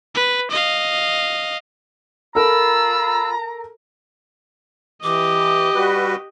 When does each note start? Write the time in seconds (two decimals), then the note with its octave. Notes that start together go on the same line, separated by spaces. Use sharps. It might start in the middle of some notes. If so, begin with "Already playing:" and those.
0.15 B4
0.51 D#5 F5
2.35 F4 A4 A#4 A#5 B5 E6
5.03 E3 G4 D#5 D6
5.75 G3 F#4 B4